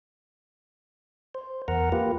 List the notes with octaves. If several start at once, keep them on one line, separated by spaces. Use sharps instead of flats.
C5
E2 A#4 F#5 A#5
A#3 F4 G4 B4